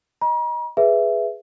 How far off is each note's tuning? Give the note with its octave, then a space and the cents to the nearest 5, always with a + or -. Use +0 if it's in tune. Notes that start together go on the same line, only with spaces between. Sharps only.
D#5 +0 A#5 +45
G#4 +0 B4 +0 E5 +15